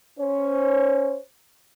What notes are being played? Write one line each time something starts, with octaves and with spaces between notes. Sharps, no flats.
C#4 C5 C#5